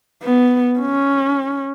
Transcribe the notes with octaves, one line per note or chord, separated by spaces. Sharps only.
B3
C#4